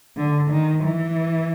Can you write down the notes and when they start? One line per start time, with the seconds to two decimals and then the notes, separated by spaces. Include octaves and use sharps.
0.17 D3
0.51 D#3
0.84 E3